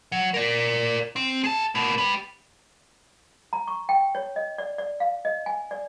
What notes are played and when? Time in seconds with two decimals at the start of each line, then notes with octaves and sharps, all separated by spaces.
0.12 F#3
0.34 A#4 D5
1.16 C4
1.44 G#4 A5
1.75 B2 A#3
1.98 G4 B4
3.53 A#5
3.68 C#6
3.89 G5
4.15 C#5
4.36 D#5
4.58 D5
4.78 D5
5.00 F5
5.25 D#5
5.46 G#5
5.71 D5